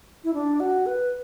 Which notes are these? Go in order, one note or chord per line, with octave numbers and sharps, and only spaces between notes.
E4
D4
F#4
B4